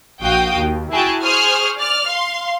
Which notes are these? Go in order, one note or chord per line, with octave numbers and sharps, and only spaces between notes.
A#1 F#4 F5 G5 D#6
D#2
E4 F#4 G#4 G5 A5
G#4 C5 C#6 D#6 F6
D5 F6
F5 C6